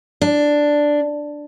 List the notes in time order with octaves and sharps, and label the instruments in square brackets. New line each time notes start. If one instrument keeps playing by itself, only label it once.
[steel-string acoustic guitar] D4